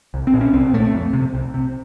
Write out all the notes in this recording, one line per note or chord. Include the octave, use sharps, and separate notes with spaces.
C2
C4
A#2
C#4
C2 C4
A#2 A3
F2
C3
C2
C3